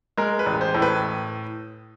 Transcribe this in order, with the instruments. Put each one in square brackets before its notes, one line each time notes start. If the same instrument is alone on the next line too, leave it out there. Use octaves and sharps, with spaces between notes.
[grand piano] G#3 A#4
B4
A1
C5
A2
B4